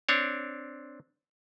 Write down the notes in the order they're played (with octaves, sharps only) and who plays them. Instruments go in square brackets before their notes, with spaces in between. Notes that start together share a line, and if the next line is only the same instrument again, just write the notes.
[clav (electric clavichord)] C4 D4 C#5